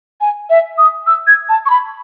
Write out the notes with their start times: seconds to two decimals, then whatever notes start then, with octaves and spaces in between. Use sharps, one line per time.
0.21 G#5
0.50 E5
0.78 D#6
1.07 E6
1.27 G#6
1.49 A5
1.66 C#6
1.70 B5